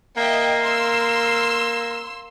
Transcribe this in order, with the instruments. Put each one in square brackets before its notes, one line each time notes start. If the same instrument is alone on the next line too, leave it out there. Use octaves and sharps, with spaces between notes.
[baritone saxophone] A#3 [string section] D#5 E5 G5
[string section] C6 E6